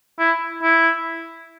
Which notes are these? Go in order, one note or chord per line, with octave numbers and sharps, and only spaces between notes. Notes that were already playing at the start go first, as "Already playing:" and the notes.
E4
E4